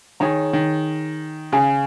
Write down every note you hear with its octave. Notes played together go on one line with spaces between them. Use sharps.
D#3 G#4 C#5 A#5
D#3
C#3 G#4 F5 G#5